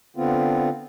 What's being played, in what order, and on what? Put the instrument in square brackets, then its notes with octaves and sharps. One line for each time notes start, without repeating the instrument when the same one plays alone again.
[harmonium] D3 B3 C4 F4